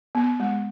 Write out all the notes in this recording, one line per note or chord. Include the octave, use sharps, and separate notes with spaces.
B3
G#3